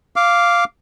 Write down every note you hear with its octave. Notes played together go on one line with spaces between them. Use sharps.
F5 D6